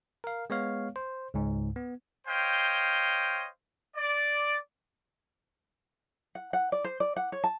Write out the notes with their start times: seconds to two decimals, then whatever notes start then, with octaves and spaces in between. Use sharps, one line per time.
0.24 A#4 F5
0.50 G#3 B3 C#5 F5
0.96 C5
1.34 C#2 G#2
1.76 B3
2.27 C5 C#5 D#5 F5 G5
3.96 D5
6.35 F#5
6.53 F#5
6.72 D5
6.84 C5
7.00 D5
7.16 F#5
7.32 C#5
7.44 A5